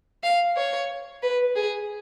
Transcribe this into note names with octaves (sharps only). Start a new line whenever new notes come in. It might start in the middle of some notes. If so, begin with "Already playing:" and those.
F5
C#5
B4
G#4